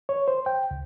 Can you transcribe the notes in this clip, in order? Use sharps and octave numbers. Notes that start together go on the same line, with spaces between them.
C#5
C5
G5
C#2